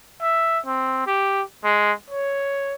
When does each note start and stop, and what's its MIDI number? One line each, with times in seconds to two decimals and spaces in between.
0.21 0.59 76
0.66 1.03 60
1.07 1.42 67
1.65 1.92 56
2.10 2.75 73